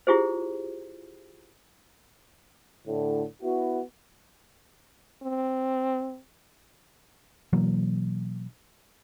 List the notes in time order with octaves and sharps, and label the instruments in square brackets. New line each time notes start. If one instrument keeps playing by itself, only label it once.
[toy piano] E4 F4 G4 G#4 C5
[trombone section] A2 D3
B3 E4 F#4
[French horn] C4
[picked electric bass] B2 E3 F#3 A#3